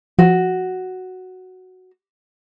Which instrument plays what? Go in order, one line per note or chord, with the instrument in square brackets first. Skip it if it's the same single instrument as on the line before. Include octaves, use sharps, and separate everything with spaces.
[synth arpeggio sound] F3 [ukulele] F#4